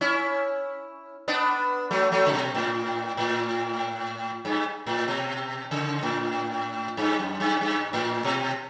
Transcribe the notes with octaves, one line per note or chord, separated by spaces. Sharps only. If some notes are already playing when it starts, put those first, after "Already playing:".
C#4 E4
B3 D4
F#3 A3
F#3 A3
C#3
B2
A2
A2
G2
A2
B2
C#3
A2
G2
F#2
G2
G2
A2
B2